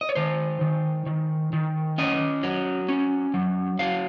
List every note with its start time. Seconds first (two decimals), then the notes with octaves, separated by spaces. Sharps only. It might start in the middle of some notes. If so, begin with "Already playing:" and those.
0.01 D#5
0.09 C#5
0.15 D#3 C5
0.61 D#3
1.06 D#3
1.53 D#3
1.98 C#4 D#5
2.43 F#3
2.89 C#4
3.34 F#3
3.79 F#3 F5